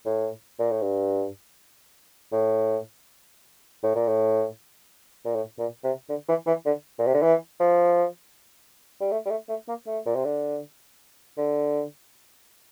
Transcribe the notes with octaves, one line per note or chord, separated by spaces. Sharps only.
A2
A#2
A2
G2
A2
A2
A#2
A2
A#2
A2
A#2
C3
D3
E3
E3
D3
A#2
C3
D3
E3
F3
G3
A3
G3
A3
A3
A#3
A3
A#2
C3
D3
D3